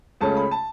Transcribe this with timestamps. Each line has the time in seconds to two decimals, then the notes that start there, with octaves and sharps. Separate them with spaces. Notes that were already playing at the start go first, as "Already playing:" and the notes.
0.21 C#2 C#3 A3 C#4 A5
0.37 B5
0.51 A5